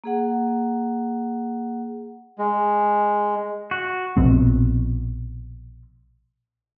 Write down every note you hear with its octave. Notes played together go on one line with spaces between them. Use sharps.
A#3 G#4 F#5
G#3
F#4
A#1 B2 F3 C4